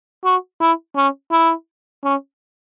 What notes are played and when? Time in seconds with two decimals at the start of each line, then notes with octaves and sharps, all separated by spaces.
0.25 F#4
0.60 E4
0.96 C#4
1.31 E4
2.04 C#4